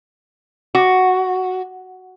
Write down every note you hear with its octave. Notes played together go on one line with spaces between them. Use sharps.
F#4